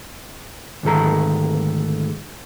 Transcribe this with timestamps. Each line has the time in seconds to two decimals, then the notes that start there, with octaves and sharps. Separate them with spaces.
0.83 D2 G#2 D#3 A4 A#5